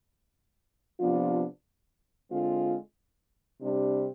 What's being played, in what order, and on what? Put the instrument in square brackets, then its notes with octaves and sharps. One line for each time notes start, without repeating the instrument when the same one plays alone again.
[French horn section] C3 F3 B3 D4 F4
D3 G#3 C4 F4
C3 G3 D4 G4